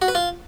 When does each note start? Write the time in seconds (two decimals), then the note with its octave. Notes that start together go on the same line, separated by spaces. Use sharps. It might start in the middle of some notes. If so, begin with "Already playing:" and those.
0.02 F#4
0.08 B4
0.15 F4